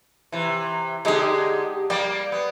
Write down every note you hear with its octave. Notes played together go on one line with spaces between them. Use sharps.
C3 E3
D3 G#3 D#4 G4 G#4
G3 A#3 D5 G5
B3